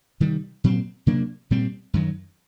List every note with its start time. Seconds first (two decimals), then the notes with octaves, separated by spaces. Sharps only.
0.20 C3 D#3 G3
0.64 A#2 F#3 C4
1.07 C3 F#3 A#3 D4
1.51 A#2 G3 C4
1.94 F#2 D#3 F#3